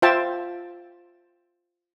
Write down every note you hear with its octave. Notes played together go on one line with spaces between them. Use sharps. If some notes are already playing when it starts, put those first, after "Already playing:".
F4 C5 E5 G5 A5